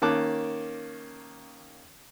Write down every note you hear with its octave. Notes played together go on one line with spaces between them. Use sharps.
D#3 A#3 C#4 A5 D6 F#6